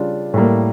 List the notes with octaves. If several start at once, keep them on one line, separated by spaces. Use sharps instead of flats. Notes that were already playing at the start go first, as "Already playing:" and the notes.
Already playing: C#3 G3 D4 F4
A2 G3 A#3